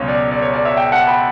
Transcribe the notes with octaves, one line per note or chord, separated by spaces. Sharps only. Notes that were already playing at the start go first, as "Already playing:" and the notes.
Already playing: C#2 B2 F#3 C#4 C#5
D5
D5
C#5
D5
C#5 E5
E5 G5
F#5 A5
G5 B5